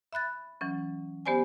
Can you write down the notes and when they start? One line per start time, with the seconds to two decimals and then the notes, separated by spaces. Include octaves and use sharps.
0.13 E5 B5 F#6 A6
0.61 E3 F#3 C#4
1.26 B3 G4 C5 D5 G#5